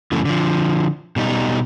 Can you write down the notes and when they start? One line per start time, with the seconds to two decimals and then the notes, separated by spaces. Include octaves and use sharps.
0.12 F#2 C#3 E3 A3
0.25 D3 F3
1.16 B2 G3 D#4